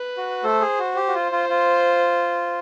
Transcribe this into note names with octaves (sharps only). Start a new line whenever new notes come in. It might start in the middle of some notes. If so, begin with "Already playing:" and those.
Already playing: B4
F#4
A3 A4 C5
G#4
F#4
G4 C5
F#4
F4
F4
F4